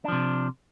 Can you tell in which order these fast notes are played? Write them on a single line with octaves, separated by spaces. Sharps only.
D4 F3 C3